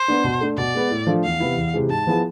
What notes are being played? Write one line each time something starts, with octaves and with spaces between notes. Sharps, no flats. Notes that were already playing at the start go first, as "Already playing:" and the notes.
Already playing: C5
B3 D4
B2
A3 D4
B2 D5
G#3 B3
A2
F3 A3 D4 F4
E2 F5
C3 E3 B3 E4
E2
C3 E3 G#3
G#2 A5
F3 B3 E4 G#4